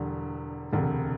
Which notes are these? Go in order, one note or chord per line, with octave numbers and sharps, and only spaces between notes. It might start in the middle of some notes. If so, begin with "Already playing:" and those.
Already playing: E1 E2 D3 G3
E1 D2 C3